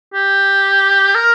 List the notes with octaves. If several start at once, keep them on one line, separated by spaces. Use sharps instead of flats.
G4
A#4